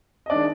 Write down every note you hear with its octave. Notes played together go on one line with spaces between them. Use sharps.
D#5
D#3 G#3 D4 D5